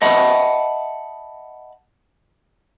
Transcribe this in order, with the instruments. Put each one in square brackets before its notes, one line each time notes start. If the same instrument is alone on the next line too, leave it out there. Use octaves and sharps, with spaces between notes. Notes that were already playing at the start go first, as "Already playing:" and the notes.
[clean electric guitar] D#5 E5 F#5 A5 B5